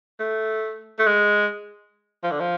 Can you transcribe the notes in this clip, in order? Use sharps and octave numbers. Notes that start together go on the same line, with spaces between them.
A3
A3
G#3
F3
D3
F3